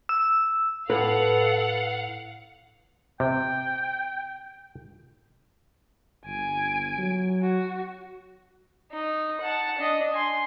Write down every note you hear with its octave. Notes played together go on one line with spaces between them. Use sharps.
E6
A2 A4 B4 F5 F#5
C3 G5
G1 G#5 D7
F#3
F#4
D#4
F#5 A5
D4 D#5
G#5 C6